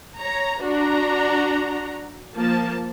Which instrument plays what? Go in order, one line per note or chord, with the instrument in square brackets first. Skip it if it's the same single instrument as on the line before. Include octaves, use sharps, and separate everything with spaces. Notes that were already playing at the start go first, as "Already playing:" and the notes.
[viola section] C#5 A#5
D4 F#4 A#5
F3 A#3 A5